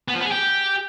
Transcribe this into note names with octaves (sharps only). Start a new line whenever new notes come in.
B3
F3
B3
G#4
G4